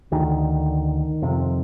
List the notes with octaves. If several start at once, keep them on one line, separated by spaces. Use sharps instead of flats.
D2 D3 D#3
F2 C3